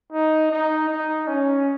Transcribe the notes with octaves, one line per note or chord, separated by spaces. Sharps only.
D#4
D#4
D#4
C#4